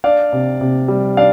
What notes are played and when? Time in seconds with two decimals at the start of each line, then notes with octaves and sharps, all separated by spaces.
0.04 D4 D5 F5
0.32 C3
0.61 C3
0.88 G3
1.17 D4 D5 F5